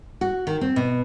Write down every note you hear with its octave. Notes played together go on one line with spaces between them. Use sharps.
F#4
D#3
C4
B2